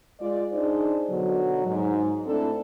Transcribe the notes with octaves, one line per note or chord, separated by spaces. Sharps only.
G#3 F4 D5
D4 D#4 G#4 C5
B2 D3 F#3
G#2
A3 C4 D4 E4 A4